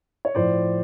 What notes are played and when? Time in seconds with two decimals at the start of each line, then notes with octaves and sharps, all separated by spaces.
0.25 C#5
0.35 A2 F3 C5 D5